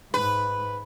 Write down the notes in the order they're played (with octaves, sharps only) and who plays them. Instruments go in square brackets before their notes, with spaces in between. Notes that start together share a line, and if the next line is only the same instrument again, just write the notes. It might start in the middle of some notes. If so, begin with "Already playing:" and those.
[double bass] G#2 [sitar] B4